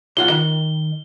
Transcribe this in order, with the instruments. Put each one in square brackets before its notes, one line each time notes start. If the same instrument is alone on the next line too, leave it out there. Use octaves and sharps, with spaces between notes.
[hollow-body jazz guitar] B1 F4 F#5 [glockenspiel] G7
[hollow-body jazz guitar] D#3